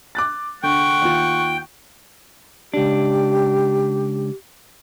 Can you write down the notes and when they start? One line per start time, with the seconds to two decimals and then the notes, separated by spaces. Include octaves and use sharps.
0.15 D6 F#6 A6
0.63 D3 F#5 G5 C#6
1.02 D#2 F4
2.74 C#2 D4 G4